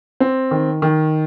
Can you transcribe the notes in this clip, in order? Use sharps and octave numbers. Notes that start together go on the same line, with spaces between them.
C4
D#3
D#3